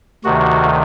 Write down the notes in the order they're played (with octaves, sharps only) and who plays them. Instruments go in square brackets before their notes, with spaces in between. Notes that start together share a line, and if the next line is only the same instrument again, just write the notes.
[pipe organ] D2 C3 D#3 F#4